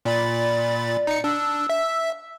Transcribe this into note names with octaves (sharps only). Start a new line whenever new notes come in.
A#2 D5 B5 A6
D#4 C#7
D4 E6
E5